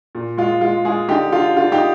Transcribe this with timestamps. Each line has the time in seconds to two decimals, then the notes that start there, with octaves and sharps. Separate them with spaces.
0.15 A#2
0.38 G#3 F4
0.61 G#3 F4
0.85 G#3 F4 G#4
1.09 D3 D#4 G4
1.32 D3 F4
1.57 D3 F4
1.72 D#4 G4